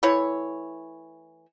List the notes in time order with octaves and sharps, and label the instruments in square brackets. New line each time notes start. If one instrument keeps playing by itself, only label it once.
[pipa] E3 A3 E4 C#5